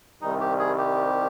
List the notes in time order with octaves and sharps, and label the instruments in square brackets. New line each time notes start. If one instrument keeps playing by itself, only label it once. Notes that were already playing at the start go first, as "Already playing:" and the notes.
[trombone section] C2 C3 D#3 G3 [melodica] D#4
[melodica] G4
G#4
G4